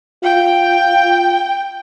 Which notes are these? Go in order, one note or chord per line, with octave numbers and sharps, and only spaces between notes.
F4 G5